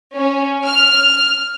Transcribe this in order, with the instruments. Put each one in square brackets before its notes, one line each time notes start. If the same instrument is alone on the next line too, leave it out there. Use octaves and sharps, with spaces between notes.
[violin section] C#4
F6